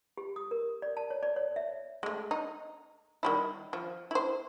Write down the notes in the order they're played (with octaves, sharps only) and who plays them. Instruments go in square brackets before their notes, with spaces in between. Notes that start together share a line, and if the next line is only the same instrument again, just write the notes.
[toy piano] G4
D#6
A#4
D5
A5
C#5
D5
C#5
E5
[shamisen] G#3 A3
D#4
D#3 G3 E4
F3
E4 C5